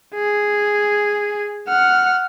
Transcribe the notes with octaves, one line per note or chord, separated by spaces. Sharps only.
G#4
F#5 F6